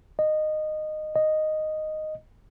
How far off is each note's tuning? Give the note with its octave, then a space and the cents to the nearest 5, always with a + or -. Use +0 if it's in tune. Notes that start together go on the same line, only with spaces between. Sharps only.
D#5 -15
D#5 -5